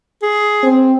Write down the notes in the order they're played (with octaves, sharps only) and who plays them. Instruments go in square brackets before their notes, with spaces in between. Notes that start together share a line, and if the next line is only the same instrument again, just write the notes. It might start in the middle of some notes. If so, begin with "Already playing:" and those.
[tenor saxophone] G#4
[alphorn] C4